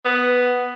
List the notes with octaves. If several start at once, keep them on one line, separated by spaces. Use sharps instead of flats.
B3